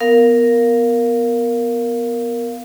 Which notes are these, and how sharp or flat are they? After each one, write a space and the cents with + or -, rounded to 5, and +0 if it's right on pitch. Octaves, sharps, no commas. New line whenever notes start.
B3 +0 A#4 +0 F5 +0